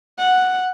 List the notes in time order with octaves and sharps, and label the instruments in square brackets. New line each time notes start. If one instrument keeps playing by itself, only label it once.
[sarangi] F#5